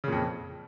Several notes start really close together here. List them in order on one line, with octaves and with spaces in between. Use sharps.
C#3 A#2 F2